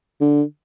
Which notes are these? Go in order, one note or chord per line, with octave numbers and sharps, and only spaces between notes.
D3